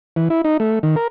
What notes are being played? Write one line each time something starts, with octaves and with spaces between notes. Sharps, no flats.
E3
E4
D#4
A3
D#3
A#4